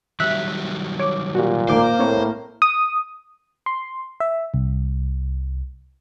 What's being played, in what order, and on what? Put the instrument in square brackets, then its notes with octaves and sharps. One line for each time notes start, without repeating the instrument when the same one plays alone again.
[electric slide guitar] D#3 F#3 G3 [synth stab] E5 F#6 B6
[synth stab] C#5 D6
[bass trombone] A#2 [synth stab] F#4 G4
[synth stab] A1 D#3 D6 [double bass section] A#3 [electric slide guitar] C5
[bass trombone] A2 [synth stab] C4 C#5
[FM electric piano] D#6
C6
E5
C2